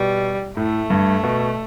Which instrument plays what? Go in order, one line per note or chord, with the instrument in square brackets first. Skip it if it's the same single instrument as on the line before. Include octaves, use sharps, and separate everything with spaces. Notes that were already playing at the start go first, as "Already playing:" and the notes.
Already playing: [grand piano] B2 [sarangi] G3
[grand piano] A2 [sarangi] A3
[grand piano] G2
B2